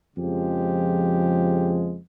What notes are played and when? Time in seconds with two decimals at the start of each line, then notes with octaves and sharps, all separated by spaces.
0.16 F2 C#3 F3 G#3 G4